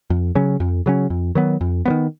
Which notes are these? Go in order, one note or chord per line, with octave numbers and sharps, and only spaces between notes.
F2
C#3 F#3 C#4
F2
C#3 F#3 C#4
F2
D#3 F#3 B3
F2
D#3 F#3 B3